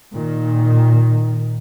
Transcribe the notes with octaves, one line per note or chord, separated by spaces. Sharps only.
A#2 D#3